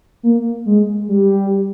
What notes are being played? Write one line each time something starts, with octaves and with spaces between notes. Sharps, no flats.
A#3
G#3
G3